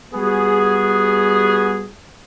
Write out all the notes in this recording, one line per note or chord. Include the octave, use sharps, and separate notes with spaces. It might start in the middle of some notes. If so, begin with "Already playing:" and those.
G3 B3 F#4 G#4